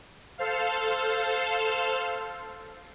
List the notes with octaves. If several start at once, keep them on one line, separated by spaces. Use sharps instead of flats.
A4 C5 F5